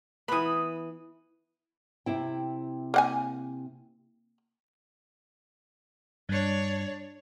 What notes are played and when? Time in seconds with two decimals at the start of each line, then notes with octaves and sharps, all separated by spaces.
0.28 E3 B3 B5 D#6
2.06 C3 E4 G5
2.94 A#3 F#5 G#5
6.29 G2 D4 C#5